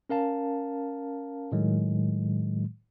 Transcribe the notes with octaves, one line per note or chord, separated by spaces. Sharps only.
C#4 A#4 F5 A5
A2 D#3 F#3 G#3